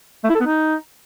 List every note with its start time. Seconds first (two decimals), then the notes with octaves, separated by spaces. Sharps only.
0.24 A3
0.29 E4
0.35 A4
0.40 B3
0.46 D#4